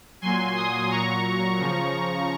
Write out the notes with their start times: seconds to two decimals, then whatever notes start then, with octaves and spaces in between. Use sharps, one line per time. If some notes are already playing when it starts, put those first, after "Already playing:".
0.21 A#2 F#3 G#5 C6
0.55 C6 D#6
0.89 A#2 F#3 A#5 C#6
1.58 C#3 F3